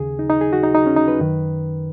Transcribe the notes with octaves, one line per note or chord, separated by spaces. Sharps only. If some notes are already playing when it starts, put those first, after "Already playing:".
Already playing: D#2 C#3 G#4
D#4
D#4
G#4
F#4
D#4
D#4
C#4
D#4
B4
F#2 D#3